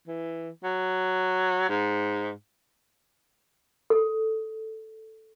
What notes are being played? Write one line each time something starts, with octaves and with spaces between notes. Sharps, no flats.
E3
F#3
G#2
A4